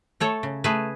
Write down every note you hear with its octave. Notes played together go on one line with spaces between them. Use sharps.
A3 A4 C#5
C#3
A3 G#4 B4